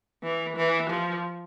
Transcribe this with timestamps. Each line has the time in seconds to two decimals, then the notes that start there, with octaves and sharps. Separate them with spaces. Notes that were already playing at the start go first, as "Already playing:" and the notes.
0.23 E3
0.56 E3
0.89 F3